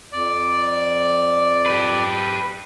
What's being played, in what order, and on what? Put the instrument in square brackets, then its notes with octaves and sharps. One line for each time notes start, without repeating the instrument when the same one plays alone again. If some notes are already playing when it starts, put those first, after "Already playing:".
[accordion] F2 D5
[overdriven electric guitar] G4 B4